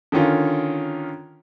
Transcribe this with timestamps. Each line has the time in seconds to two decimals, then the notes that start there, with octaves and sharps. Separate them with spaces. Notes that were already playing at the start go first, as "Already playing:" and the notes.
0.12 D3 D#3 C#4 F4